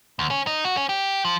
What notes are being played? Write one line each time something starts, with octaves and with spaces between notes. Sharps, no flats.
D2
C#4
D#4
F#4
C#4
G4
F3